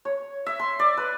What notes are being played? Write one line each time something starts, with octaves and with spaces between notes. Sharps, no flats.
C#5
E5
C6
D5
B4